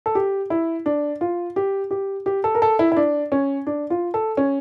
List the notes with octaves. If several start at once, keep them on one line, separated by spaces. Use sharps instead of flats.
A4
G4
E4
D4
F4
G4
G4
G4
A4
A#4
A4
E4
E4
D4
C#4
D4
F4
A4
C#4